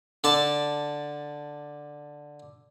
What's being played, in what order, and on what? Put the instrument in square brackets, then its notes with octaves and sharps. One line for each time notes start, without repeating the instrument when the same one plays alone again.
[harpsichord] D3 D5 A5